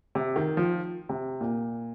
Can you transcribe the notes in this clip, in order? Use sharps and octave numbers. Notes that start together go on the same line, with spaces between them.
C3
D#3
F3
C3
A#2